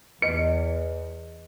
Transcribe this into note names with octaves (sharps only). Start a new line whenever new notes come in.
E2 B4 D#5 C#7